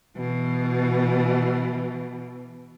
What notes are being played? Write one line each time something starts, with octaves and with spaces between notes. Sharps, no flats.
B2 E3